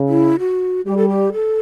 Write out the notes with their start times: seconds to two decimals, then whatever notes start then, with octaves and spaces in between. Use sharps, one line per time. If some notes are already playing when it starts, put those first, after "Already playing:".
Already playing: C#3
0.08 E4
0.39 F#4
0.86 G3 G4
0.97 A4
1.09 G4
1.33 A4